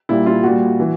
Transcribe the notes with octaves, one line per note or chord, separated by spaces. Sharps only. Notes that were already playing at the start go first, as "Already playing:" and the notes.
A#2 G3 E4
F4
A#2 G3 F#4
E3